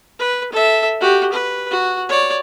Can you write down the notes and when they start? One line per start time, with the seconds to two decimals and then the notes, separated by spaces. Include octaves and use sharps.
0.19 B4
0.52 A4 E5
1.01 F#4 G4
1.32 B4
1.71 F#4
2.09 C#5 D5